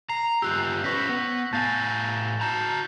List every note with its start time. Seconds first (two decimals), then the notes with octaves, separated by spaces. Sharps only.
0.09 A#5 C7
0.42 G2 F4 G4 E6 F#6 G6
0.84 C#4 B4 C5 C#6 A#6 B6
1.09 B3
1.53 A2 F5 G#5 A5 G6 A6
2.41 F#4 A5 A#5 G6 E7